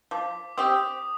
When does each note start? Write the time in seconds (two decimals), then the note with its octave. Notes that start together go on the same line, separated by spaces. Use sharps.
0.11 F3 D6
0.58 C4 G4 D#6